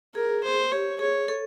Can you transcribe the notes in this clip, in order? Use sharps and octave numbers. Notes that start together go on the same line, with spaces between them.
G#4 A#4
C5
G4 C#5
G#4 C#5
A4